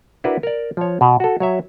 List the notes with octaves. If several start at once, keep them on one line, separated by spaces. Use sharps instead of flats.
D4 E4 F#4 A#4 B4
A#4 D5
F3 C#5
B2
F#4 A4
F#3 C#5 E5